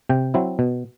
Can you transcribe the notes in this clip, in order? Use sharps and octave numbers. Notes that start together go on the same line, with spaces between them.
C3 G5
F#3 C4 E4
B2